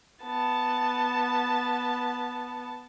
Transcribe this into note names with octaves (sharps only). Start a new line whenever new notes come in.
B3 A5